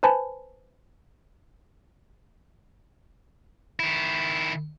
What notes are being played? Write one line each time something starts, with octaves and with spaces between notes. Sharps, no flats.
B4 C5 G#5 A5 B5
D#3 E4